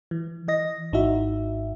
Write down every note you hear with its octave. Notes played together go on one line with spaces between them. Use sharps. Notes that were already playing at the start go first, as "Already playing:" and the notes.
E3
E3 D#5 A#6
G#1 G#2 D#4 E4 F#4 E5